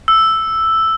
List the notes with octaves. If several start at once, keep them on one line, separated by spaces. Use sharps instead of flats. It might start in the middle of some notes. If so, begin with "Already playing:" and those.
E6